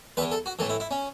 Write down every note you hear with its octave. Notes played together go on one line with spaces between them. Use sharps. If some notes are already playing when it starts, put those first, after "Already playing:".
E2 E3 B4
A4
F#4
A2 E3 A4
E4
E4
C#4